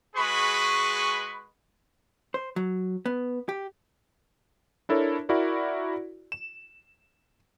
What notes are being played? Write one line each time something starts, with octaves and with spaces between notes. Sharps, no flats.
G#3 F#4 G#4 B4 B5 C#6
C5
F#3
B3
G4
D4 E4 A4 A#4 C#5
E4 F#4 A#4 D5
E7